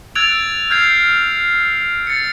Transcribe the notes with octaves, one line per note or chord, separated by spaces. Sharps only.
E6 F#6 G#6 A6 D7 F7
F6 G6 G#6 C7
A6 C#7